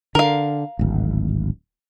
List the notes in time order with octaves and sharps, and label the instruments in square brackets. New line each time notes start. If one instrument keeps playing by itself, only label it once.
[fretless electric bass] D3 [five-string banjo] A#4 F5
[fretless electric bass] D1 G#1